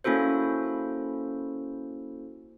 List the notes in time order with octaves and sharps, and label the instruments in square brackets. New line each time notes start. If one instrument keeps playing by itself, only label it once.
[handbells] A#3 C#4 E4 F#4 A4 C5